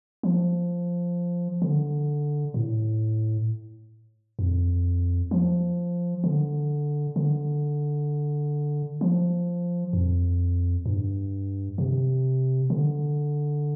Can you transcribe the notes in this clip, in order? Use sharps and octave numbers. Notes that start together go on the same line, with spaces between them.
F3
D3
A2
F2
F3
D3
D3
F3
F2
G2
C3
D3